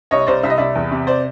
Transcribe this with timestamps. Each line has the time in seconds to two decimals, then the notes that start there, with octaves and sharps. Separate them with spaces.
0.11 C2 C#5 D#5
0.27 C2 C5 D5
0.43 C2 E5
0.50 D#5
0.58 C2 D5 E5
0.75 E2
0.91 C3
1.07 C5 D5